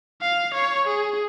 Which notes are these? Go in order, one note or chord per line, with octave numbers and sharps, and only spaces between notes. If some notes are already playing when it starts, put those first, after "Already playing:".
F5
C#5
G#4